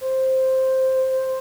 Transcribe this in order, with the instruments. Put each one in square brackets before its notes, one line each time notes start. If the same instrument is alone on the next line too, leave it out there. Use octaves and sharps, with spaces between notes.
[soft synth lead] C5